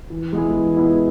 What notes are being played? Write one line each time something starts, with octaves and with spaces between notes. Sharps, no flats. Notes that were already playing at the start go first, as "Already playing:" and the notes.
E3
G#3 B3 E4 G#4
E3
G#3 B3 E4 G#4